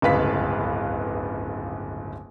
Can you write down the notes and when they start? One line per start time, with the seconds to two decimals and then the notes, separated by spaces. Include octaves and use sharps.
0.02 D1 G1 C#2 B4 F5 B6